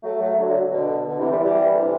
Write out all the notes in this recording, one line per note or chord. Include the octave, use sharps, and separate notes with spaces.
F#3 A3
F#3 A3
D3 F#3
D3 F#3
B2 D3
B2 D3
C3 E3
E3 G3
E3 G3
D3
C3 E3